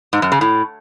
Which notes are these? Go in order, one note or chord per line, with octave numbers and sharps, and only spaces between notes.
G#2
F#2
C#3
A2